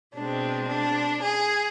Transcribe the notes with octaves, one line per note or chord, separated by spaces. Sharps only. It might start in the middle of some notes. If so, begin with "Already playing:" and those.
B2 G#3 C4 D4
D4
G#4